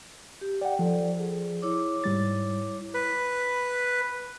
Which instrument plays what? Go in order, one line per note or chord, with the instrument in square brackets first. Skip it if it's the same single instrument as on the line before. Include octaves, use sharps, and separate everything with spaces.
[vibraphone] G4
[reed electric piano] D5 F#5 [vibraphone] G5
[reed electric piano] F3 [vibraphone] A4 D5
[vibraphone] G#4
E4 C#5 D6
[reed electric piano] G#2 G3 A6
[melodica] B4